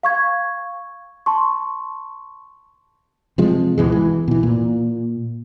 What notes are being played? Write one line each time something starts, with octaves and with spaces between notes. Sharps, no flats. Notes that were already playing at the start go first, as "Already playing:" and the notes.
F5 C#6 G#6
A5 C6 C#6
C3 F3 G#3
D1 B2 E3 G#3
E3
B2 E3
A#2